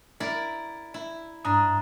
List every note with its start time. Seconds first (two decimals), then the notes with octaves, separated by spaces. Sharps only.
0.20 E4 A#4 D5
0.94 E4
1.45 G2 D4 A#5 D#6